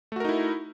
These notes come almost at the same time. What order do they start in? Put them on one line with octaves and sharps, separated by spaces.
A3 F#4 A#4 D#4 E4